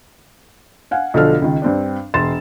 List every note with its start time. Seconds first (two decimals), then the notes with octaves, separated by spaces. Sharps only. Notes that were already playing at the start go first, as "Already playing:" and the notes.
0.91 F5 F#5 G#5
1.14 B1 D3 F3 D4 A4 F6
1.42 C#2 D#3
1.62 G2 C4 D4
2.14 E1 C6 A6 E7